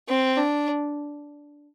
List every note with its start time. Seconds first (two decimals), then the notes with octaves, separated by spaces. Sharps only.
0.09 C4
0.38 D4